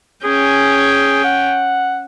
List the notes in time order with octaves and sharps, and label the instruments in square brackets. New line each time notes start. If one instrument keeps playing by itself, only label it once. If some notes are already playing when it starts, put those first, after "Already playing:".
[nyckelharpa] C#4 G5 [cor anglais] G#4
[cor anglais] F#5